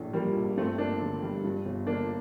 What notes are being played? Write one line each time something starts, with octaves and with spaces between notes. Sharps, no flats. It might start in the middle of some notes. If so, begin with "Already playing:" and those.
Already playing: A#1 A2
F3 G3 A#3
A#1
G2 A3 C4
G1 A#3 D4
D3
G3
G2
G1
D3 A#3 D4